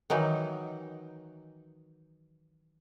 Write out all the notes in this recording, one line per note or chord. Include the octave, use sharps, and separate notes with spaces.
D#3 E3 F#3 D#4